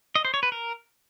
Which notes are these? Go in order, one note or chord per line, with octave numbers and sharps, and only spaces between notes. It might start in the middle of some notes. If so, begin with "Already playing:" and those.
D#5
C5
C#5
B4
A#4